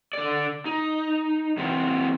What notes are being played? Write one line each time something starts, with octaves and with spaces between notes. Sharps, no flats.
D3 D5
D#4
E3 B3 C4